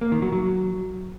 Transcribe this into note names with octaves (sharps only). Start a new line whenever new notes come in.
A#3
D#3
F#3
F#3